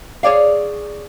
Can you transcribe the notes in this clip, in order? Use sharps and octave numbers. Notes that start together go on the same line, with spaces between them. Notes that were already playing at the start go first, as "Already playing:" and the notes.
G#4 C#5 D5 F5